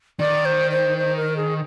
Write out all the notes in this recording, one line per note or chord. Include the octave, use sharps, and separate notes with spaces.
D#3 D5
C5
C5
C5
A#4
G#4